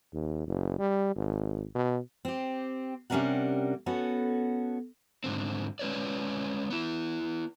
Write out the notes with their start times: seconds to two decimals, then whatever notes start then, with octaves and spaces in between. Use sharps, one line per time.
0.14 D#2
0.47 F#1
0.78 G3
1.16 G#1
1.75 B2
2.25 C4 G4
3.10 C3 G3 C#4 D4 A#4 F#5
3.86 B3 C#4 F#4 A4
5.24 G#2 D3 C4
5.79 G#3 C#4 B4 C#5 D5
6.70 B3 E4